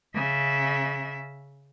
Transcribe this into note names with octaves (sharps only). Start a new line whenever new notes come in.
C#3 E5